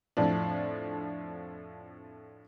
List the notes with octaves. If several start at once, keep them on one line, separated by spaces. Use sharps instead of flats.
F2 A2 F3 D4